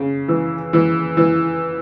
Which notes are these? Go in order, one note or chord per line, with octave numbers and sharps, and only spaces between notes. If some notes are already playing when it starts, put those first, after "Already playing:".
Already playing: C#3
E3
E3
E3